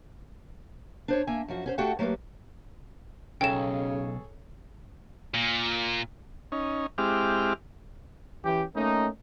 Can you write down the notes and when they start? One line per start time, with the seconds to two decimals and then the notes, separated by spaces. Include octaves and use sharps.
1.08 D4 C5 C#5
1.27 A#3 E5 G#5
1.48 F#2 F3 F#4
1.66 C#4 G#4 C5
1.78 A3 F#4 G4 A4 F#5 G5
1.99 F#3 A3 A#3 G4 B4
3.41 B1 C#3 G#4 A4 C#5 G5 E7
5.34 A#2
6.52 C#4 D#4
6.98 G#3 C4 E4 G4 D6 F6
8.43 E3 C#4 G4
8.75 A3 A#3 C#4 D#4